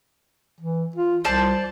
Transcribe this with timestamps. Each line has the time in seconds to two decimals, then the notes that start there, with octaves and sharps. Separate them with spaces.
0.61 E3
0.96 F4
1.24 C2 C5 D5 A5